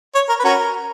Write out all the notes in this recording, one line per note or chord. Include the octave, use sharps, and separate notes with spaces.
C#5
A#4
B4
C#4 F#4 A#4